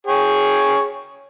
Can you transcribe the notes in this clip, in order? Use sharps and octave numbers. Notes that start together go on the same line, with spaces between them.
G#4 C#5 G5